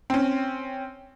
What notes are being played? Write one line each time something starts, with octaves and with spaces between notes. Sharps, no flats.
C4 C#4